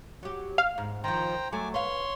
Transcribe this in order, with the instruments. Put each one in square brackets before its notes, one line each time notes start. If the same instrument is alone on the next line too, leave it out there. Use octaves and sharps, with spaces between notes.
[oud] F#3 G4
[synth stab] F5
[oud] G#2
[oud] D#3 F3 [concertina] C5 G5 A#5
[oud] F#3 A3 [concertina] G#5 D6
[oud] B4 F5 [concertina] C#5 C6